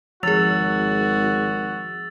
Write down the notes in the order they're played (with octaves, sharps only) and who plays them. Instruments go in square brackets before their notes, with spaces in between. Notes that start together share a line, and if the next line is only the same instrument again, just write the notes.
[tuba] G#1 [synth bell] F3 G#4 [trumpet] F#4 [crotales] E6 A6 F7